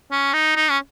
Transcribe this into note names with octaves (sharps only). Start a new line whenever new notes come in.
C#4
D#4
D#4
C#4